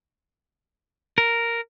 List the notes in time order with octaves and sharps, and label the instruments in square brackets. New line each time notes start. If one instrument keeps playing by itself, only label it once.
[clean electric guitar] A#4